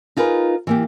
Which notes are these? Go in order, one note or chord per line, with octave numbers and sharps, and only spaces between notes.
D#4 F4 G#4 A#4 B4
E3 A#3 G4